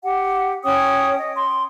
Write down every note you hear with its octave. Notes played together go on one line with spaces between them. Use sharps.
G4 F#5
C#4 C#5 G5 D#6
D#5
C6